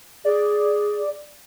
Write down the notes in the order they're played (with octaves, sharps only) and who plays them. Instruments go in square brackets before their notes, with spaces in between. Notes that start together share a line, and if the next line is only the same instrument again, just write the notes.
[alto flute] G#4 [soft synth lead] D5